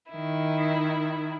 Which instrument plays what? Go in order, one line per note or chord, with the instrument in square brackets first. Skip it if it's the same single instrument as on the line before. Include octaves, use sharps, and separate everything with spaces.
[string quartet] D#3 E4